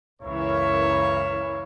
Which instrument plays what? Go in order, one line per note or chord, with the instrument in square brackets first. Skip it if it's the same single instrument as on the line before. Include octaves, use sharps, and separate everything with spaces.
[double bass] C#2 F#2 [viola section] E3 A#4 F5 [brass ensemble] C#5 E5